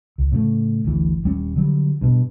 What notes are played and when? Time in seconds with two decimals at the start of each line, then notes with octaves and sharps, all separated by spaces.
0.18 C#2
0.32 A2 C#3 F3 A3
0.84 G1 D2 E3
1.24 D#1 G3 C#4
1.56 D3 F#3 G3
2.01 G2 B2